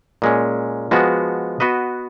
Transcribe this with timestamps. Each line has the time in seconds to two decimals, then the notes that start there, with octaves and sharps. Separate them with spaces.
0.22 A#2 G#3 C#4
0.91 F3 G#3 B3 F#4
1.60 B3 F#4 B4 D#5